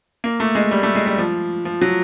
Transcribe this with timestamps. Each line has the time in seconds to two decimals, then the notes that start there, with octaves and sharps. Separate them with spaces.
0.24 A#3
0.40 A3
0.55 G#3
0.71 G3
0.83 A3
0.95 G#3
1.06 G3
1.18 F3
1.65 F3
1.82 F#3